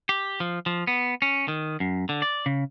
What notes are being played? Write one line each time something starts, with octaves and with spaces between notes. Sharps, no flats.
G4
F3
F3
B3
C#4
D#3
F#2
D3
D5
C#3